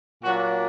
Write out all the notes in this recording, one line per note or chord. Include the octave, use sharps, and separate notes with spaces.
A#2 F#3 A#3 D4 F#4